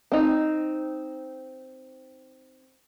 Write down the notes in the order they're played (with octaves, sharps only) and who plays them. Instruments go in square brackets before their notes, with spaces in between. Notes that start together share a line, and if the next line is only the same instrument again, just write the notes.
[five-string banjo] C4 D#4